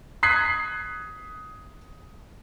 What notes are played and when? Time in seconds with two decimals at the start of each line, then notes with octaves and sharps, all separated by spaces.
0.23 D#6 F#6 G#6 B6 C7